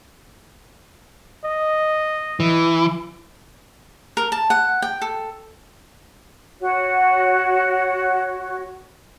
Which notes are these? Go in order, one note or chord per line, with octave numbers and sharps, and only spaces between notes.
D#5
E3
A#4
A5
F#5
G5
A4
F#4 C#5